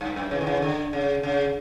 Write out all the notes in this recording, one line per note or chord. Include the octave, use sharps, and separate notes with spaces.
G2
F#2
C#3 E3
D3
C#3 E3
D3
C#3
C#3